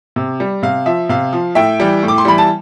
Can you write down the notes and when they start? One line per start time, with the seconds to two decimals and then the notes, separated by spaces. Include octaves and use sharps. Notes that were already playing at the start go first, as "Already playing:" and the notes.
0.16 C3
0.40 G3
0.63 C3 F5
0.86 F3 E5
1.09 C3 F5
1.33 F3
1.55 A2 E5 G5
1.80 E3 G3
2.03 A2
2.08 D6
2.18 C6
2.25 E3 G3 B5
2.38 A5